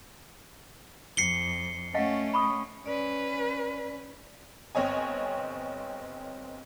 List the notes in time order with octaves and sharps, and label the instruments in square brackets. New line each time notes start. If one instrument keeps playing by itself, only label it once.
[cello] F2 [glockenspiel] C7 C#7 G7
[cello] A3 C#4 [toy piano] D#5 F5 F#5
[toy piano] B5 C#6 D#6
[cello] C#4 B4 [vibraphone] D5
[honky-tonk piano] G1 C4 C#5 D#5 G#5